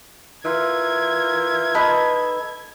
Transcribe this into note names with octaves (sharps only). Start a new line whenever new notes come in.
E3 F4 A#4 E5 G#6
D#4 A4 B4